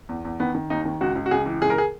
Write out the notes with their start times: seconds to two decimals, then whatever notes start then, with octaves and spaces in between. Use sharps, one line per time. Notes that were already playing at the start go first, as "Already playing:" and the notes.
0.09 E2
0.25 E2
0.40 D#3 B3
0.55 D#3
0.70 D#2 D#4
0.85 D#3
1.01 C#2 F#4
1.15 C#2
1.26 F#4
1.31 C#2 G#4
1.46 E3
1.62 C#2 G#4
1.70 A#4
1.78 G#4